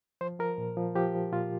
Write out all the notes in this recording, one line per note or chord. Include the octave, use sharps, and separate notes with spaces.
F3 C5
F3 A#4
A#2
F3
F3 G4
F3
A#2 F4